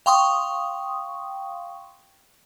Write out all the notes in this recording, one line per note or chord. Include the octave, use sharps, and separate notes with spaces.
F5 G5 C6 C#6 D#6